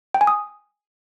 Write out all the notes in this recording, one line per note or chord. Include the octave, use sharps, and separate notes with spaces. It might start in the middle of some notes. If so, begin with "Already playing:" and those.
G5
G#5
D#6